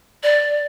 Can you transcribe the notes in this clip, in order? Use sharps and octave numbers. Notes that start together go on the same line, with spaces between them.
D5